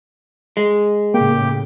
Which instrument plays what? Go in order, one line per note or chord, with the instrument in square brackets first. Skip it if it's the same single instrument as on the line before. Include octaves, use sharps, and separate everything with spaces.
[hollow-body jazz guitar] G#3
[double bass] A2 C#3 [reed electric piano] A#3 [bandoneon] G4 G5